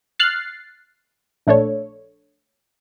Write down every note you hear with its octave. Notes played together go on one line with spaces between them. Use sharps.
F6 F#6 A6 C7
A#1 A3 D4 A4 C#5